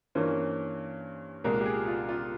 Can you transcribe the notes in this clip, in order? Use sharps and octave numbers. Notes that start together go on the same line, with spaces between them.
G2 E3 A#3 C#4 C5
C2 A#2 G#3 A#4
G4
G#4
F4
F4